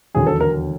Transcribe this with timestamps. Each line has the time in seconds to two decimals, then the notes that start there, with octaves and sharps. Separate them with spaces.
0.15 E1 D#2 D3 F#3 G#4
0.27 A4
0.40 A#4